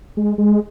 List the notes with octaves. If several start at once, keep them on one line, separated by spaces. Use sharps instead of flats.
G#3
G#3